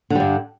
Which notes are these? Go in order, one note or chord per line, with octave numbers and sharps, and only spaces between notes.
G2 D3 G3